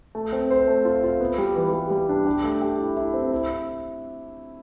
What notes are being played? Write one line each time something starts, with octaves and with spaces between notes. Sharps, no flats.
A3
C4
C5
A3
F4
F4
B3
G3
E3
G3
G3
D4
G4
A3
G4
E4
E4
C4
E4